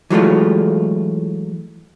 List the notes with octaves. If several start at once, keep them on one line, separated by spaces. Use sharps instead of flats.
E3 F#3 G#3 A3 F4